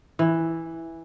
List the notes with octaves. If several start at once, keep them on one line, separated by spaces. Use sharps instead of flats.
E3